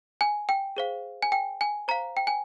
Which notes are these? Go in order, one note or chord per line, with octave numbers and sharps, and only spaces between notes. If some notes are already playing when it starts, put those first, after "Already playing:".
G#5
G5
G#4 C5 F5
G#5
G5
G#5
C5 F5 A#5
G5
G#5